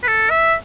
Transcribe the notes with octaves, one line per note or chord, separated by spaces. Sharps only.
B4
A4
E5